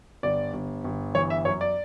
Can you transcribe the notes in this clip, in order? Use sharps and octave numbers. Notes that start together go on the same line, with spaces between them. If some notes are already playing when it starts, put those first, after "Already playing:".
G1 D5
G1
G1
E3 C#5
E5
F#2 C#5
D5